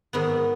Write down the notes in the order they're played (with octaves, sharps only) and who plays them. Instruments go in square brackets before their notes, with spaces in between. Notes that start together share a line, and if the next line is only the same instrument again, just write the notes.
[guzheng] G#2 D#3 F#3 B3